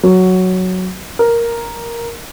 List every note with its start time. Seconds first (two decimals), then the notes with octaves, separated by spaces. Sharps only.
0.03 F#3
1.19 A#4